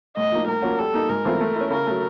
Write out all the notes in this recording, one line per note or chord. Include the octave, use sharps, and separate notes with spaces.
A2 D#5
F3 A#3 D#4
A2 A#4
F3 A#3 C#4 F#4
G3 A4
A#3 D#4
G#2 A#4
E3 A3 C4 F4
A3
E4
C#4
C#3 A#4
F#3 A3